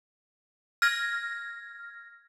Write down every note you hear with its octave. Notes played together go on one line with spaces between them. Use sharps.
F6 G#6 A#6